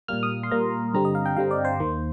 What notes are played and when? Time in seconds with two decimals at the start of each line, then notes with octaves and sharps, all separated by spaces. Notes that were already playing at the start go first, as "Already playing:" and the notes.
0.08 A#2 G3 A#3 F6
0.23 D#6
0.43 C6
0.51 A#2 G3 A#3 A#5
0.94 G2 D3 G3 C4 A#5
1.05 D#5
1.15 F5
1.26 G5
1.36 G2 D3 G3 C4 F5
1.51 D5
1.65 C5
1.80 D#2 D#3 A#3